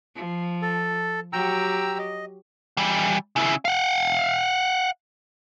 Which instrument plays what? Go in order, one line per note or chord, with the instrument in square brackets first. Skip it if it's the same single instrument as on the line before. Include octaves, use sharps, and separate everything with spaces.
[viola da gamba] F3
[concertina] A4
[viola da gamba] F#3 G4 [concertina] G5 A#5 E6
[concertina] D#5
[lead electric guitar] E3 G3
C#3 E4
F5 F#5